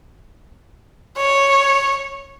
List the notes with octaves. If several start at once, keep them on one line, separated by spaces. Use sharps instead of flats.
C#5